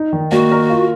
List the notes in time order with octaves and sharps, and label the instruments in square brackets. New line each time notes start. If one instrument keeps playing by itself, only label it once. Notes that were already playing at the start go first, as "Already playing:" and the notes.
Already playing: [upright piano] D#4
D#3
[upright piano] A#3 [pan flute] F#4
[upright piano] A#4
F4